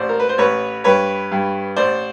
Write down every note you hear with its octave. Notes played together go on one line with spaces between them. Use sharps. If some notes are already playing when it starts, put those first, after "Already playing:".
Already playing: A1 C5 D5
A#4
B4
C5
A1 B4 C#5
G2 B4 C#5
G2
A1 C5 D5